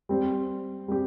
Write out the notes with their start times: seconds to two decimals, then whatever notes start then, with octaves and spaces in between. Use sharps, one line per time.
0.09 G3 C4 G4 C5
0.88 G3 C4 G4